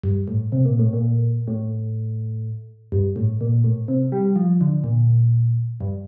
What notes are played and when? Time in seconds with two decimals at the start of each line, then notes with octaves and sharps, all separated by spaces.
0.04 G2
0.28 A2
0.52 C3
0.65 A#2
0.79 A2
0.93 A#2
1.48 A2
2.92 G2
3.16 A2
3.41 A#2
3.64 A2
3.88 C3
4.12 G3
4.36 F3
4.61 D3
4.84 A#2
5.81 G2